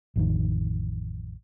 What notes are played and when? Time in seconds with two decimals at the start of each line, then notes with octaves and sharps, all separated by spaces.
0.16 A1 F2 D#3